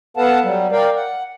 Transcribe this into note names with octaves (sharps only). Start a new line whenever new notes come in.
B3 A4 B4 F5 F#5 A5
F#3 G3
A#4 D5 F5 G5
F#5